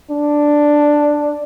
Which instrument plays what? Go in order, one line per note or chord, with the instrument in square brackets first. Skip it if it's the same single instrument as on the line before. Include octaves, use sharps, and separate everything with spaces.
[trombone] D4